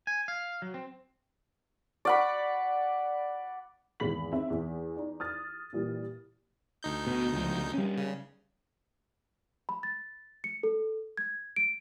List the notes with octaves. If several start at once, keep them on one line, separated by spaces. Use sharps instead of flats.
G#5
F5
F#3
C4
D5 F#5 B5
G#1 E2 G#3 B5 B6 F#7
C4 D#4 E5
E2
D#4 D5
D#6 F6 A6
A#2 E3 G3
D2 D#4 G6
B2
C#2 F3
G3 C#4
C#3
B5
A6
C#7
A4
G#6
D7